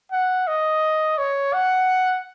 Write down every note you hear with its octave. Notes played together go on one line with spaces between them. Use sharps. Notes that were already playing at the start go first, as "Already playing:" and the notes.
F#5
D#5
C#5
F#5